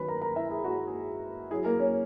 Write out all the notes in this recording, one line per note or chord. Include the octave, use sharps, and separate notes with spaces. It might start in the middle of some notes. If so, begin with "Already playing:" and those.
Already playing: D#3 F#3 C#4 B4 B5
A#4 A#5
A#4 A#5
E4 E5
G#4
F#4
G#4
F#3 C#4 E4 G#4
A#3 A#4
C#4 C#5